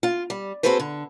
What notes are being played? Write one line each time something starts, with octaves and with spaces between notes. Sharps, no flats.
F4
G3
C4 F#4 G#4 A4 B4 C5
D3